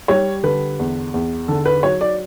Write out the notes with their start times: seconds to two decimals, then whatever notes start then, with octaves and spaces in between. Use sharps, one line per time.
0.08 G3 C#5
0.43 D3 B4
0.79 E2
1.14 E2
1.48 D3 A4
1.66 B4
1.83 F#3 C#5
2.01 D5